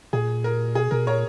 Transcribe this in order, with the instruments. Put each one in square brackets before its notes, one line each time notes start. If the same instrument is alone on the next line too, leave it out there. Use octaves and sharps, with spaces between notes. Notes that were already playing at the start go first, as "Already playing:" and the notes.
[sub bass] A#2 [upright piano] G#4
[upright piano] A#4
[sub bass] B2 [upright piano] G#4
[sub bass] B2 [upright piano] A#4
[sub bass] A#2 [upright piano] A#4 C#5